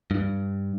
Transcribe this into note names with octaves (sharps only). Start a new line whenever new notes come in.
G2